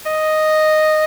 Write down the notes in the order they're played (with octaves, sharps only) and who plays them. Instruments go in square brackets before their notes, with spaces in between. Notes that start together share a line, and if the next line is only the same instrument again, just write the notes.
[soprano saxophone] D#5